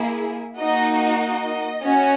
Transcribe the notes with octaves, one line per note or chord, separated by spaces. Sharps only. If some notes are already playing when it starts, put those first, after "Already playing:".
Already playing: A#3 E4 G#4
A#3 D#4 F#4 D#5
D#5
C#4 F#4